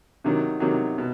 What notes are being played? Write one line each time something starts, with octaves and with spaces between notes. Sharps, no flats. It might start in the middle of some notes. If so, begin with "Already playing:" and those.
C3 D#3 F#3
C3 D#3 F#3
B2